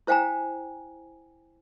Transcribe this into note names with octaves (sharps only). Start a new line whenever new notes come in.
E4 C5 F5 G5 G#5 A#5